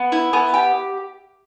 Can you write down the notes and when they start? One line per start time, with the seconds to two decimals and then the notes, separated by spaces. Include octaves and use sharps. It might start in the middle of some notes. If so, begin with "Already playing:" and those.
Already playing: B3
0.12 E4
0.33 B3
0.54 G4